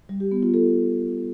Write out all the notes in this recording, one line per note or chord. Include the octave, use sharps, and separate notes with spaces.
G3
G4
B3
F4
A4